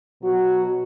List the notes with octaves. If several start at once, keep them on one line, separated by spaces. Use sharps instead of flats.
B2 F#3 F#4